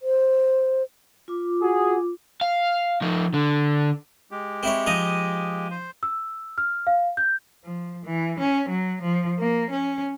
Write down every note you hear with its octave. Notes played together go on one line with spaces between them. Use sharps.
C5
F4 D6
F#4 G#4
F5
F3 D#4
D3
G#3 G4
C4 E4 C#5
F3 D#4 D#5
C5
E6
F6
F5
G6
F3
E3
C#4
F#3
F3
A#3
C#4